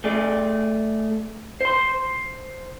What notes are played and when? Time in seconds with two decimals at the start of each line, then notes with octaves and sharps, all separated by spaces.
0.04 A3 G#4 D5
1.61 C5 C6